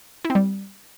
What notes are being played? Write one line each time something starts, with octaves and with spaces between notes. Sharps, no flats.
E4
C4
G3